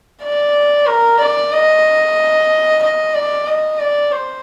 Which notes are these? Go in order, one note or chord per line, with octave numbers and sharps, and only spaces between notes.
D5
A#4
D5
D#5
D#5
D5
D#5
D5
C5